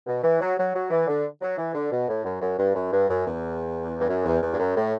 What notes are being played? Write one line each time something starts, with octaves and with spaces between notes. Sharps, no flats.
B2
E3
F#3
F#3
F#3
E3
D3
F#3
E3
D3
B2
A2
F#2
F#2
G2
F#2
G2
F#2
E2
G2
F#2
E2
E2
G2
F#2
A2